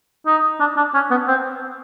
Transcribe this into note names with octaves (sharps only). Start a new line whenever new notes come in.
D#4
D4
D4
C#4
B3
C4